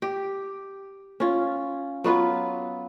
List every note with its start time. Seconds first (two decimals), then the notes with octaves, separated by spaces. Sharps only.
0.02 G4
1.20 C#4 F4
2.04 F#3 B3 F4 B4